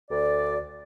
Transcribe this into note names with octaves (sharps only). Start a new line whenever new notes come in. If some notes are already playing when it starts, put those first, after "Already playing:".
D2 D5